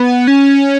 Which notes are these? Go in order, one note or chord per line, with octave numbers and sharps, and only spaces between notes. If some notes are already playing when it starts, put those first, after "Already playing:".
Already playing: B3
C#4